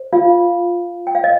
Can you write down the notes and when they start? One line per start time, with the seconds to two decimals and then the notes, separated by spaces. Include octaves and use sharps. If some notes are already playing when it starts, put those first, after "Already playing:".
Already playing: C5
0.13 F4 F5
1.07 G5
1.15 F5
1.24 D#5